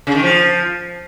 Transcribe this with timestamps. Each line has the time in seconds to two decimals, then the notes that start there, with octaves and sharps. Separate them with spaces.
0.07 C#3
0.15 D#3
0.23 F3